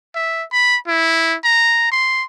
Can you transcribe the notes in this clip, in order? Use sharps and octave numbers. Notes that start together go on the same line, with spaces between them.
E5
B5
E4
A#5
C6